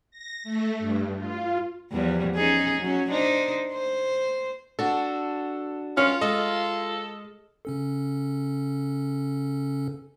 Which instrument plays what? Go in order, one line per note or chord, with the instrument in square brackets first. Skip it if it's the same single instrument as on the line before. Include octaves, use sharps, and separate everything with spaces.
[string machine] A#6
A3
G2
F4
[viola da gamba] E2 F3 G3
C#4 D#4 G#4
F#3 C#4
D4 D#4 C5
C5
[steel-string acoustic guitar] D4 F#4 [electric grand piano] A4
[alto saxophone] C#4 [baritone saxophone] F4 [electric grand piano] F6
[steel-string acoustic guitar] G#3 [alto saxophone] A4 [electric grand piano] D#5
[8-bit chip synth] C#3 C#4 A4